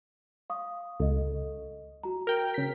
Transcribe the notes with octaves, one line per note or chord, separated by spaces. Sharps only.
F5 C#6 D#6
C#2 A4 D#5
F#4 A#5
A#4 G5
C#3 B6